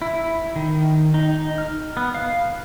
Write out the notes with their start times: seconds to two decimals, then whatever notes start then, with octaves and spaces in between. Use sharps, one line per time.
0.02 E4
0.56 D#3
1.14 D#4
1.58 F6
1.97 B3
2.14 F5